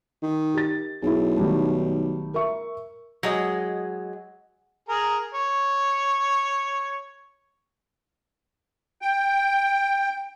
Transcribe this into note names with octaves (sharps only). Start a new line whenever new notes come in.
D#3
G4 A6
B1 E4 G#4
D#3 G3 A3
A#4 E5 C#6
F#3 G#3 D#5
G#4 A#4
C#5
G5